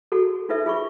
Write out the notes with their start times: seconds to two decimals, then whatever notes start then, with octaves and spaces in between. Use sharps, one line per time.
0.12 F#4 G#4 A4
0.49 D#4 F4 A4 B4 E5
0.66 F4 G#4 B5 C#6